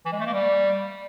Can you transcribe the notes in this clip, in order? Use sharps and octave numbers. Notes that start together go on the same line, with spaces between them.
E3
G#3
A3
A#3
G3